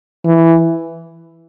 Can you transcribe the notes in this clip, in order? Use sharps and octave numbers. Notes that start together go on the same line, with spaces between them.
E3